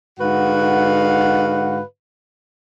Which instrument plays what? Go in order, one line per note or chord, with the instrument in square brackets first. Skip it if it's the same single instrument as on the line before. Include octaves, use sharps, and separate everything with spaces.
[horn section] G#2 D3 F#4 B4 F5 F#5